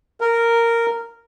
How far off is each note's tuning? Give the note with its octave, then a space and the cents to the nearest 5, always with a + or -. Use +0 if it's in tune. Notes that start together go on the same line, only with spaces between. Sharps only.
A#4 -10